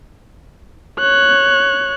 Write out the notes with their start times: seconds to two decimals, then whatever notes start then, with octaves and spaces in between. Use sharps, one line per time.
0.99 C#5 F#6